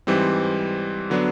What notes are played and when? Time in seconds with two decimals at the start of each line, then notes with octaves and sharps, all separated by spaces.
0.07 G#2 E3 G3 C4
1.10 D3 F#3 B3 D4